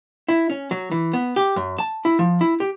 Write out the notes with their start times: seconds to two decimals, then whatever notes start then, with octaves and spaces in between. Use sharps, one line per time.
0.28 E4
0.50 C#4
0.71 F#3
0.91 E3
1.13 B3
1.36 G4
1.56 F#2
1.78 A5
2.05 E4
2.19 F3
2.41 E4
2.60 G4